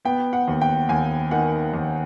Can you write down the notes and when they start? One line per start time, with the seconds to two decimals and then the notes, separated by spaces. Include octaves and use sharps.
0.05 B3 G5
0.33 F#5
0.48 D#2
0.61 G5
0.89 D#2 G#5
1.31 D#3 F#5
1.74 D#2